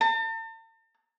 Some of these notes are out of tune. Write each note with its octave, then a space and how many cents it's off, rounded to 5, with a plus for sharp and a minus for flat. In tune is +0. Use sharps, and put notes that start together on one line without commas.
A5 +45